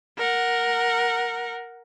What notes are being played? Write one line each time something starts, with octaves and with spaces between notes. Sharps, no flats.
A#4 F#5